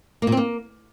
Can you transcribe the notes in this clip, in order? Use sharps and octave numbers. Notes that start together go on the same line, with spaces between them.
A#3
A#2
C4
A#3